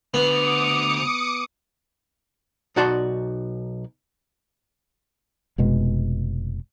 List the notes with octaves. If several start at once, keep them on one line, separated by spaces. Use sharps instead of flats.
D2 D3 B3 D6 D#6 C#7 F7
B1 D#4 F#4 D5 A5 C6
F1 B2 G#3